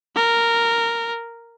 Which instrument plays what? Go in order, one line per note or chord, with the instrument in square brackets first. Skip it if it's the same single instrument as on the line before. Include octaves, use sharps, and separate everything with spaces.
[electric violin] A#4